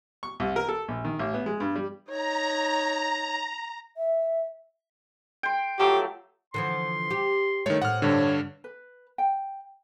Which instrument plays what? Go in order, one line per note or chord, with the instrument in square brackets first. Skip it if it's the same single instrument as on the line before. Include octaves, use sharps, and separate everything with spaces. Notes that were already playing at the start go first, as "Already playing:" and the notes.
[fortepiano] C#6
C2
A#4
A4
A#1
D#3
A1
B3
G#3
G2
G3
[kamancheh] D#4 C#5 [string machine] A#5
[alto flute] E5
[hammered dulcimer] G5 C6
[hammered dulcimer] F3 F#3 A3 [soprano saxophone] G4
[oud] D3 E3 F3 [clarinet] C6
[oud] G4
[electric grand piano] D#3 C#5 [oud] A3 C#4 E4
[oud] A2 C4 [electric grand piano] F#5 F6
[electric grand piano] G2 D3 [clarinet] C#5
[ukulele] B4
G5